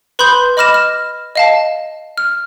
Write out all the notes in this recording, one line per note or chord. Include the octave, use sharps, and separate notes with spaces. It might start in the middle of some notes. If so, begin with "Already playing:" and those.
B4 B5 C6 D#6 G6
D#5 B5 D6 F6 A#6 E7
F6
D#5 F5 A5
F6